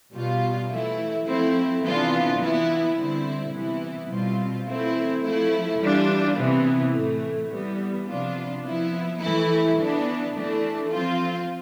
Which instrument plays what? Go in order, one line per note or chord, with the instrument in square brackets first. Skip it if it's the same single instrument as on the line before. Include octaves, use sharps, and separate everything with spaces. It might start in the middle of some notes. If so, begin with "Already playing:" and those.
[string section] B2 G3 B3 F4
E3 A3 E4
F3 A3 C4 E4
C3 E3 B3 D4 F4
E3 B3 E4
D3 G3 C4 E4
C3 E3 B3 E4
B2 G3 C4 F4
E3 A3 C4 E4
F3 A3 E4
E3 G3 D4 F4
C3 E3 B3
A2 E3 A3
E3 G3 B3
C3 F3 B3 D4 F4
F3 B3 E4
E3 A3 E4
E3 B3 D4
E3 A3 D4
F3 C4 F4